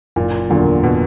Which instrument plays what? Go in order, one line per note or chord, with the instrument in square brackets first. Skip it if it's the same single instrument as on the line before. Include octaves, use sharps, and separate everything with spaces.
[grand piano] F#1 [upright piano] A#2
[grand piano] E2 D3 F#3 A#3 [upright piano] A#2
[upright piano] B2